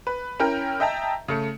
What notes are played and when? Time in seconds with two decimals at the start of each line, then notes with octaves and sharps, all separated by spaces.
0.07 B4
0.40 C#4 E4 A#4 G5
0.80 D#5 E5 G5 A5 A#5
1.28 C#3 A3 C#7